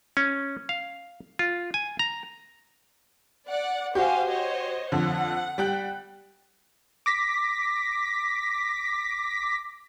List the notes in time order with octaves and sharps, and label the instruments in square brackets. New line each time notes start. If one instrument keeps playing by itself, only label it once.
[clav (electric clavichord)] C#4
F5
F4
G#5
A#5
[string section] D5 F#5
[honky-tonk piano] F#4 G4 [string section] C5 F5 G#5
[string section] C5 C#5 D#5
[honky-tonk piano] F2 D3 [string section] F#5
[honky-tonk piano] G3 G5 F#6
[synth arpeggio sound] D6 A#6 B6